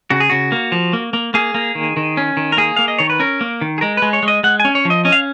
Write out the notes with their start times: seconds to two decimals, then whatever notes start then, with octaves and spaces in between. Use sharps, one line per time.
0.10 C#3 F#4
0.20 G#4
0.30 C#3 F#4
0.52 A#3
0.72 F3
0.93 A#3
1.13 A#3
1.34 A#3 G#4
1.55 A#3
1.75 D#3
1.97 D#3
2.17 C#4
2.37 D#3
2.52 A#4
2.57 A#3 G#4
2.76 A#3 F5
2.88 D#5
2.98 D#3 C#5
3.10 B4
3.20 C#4 A#4
3.41 A#3
3.61 D#3
3.78 G#4
3.81 G#3 A#4
3.97 G#3 B4
4.13 C#5
4.23 G#3
4.28 D#5
4.44 G#3 F#5
4.60 G#5
4.65 C#4
4.75 C#5
4.85 F3
4.90 D#5
5.05 C#4 D#5
5.12 F5